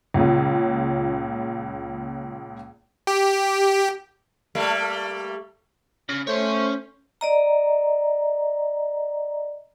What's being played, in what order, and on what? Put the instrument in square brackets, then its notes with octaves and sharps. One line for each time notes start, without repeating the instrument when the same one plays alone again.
[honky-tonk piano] C#2 A#2 C#3
[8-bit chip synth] G4
[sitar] G3 A3 A#3
[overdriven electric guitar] C#3
[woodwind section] A3 C5 [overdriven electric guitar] C#4 C#5
[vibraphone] D5 D#5 A#5